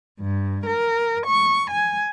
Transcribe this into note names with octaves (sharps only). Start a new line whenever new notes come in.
G2
A#4
C#6
G#5